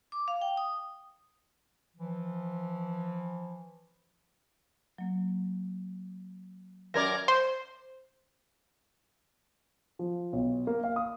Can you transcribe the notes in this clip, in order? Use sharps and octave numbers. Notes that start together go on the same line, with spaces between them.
D6
F5
G5
D#6
E3 F3
F#3 A#3
F#2 A#4 D5 D6 G#6 A#6
C5
F3
B1
A#3
F5
D#6